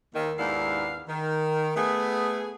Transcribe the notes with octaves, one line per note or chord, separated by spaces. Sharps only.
D#2 D#3
D#2 G#2 B3 D4 E4 F5
D#3
A3 B3 G#4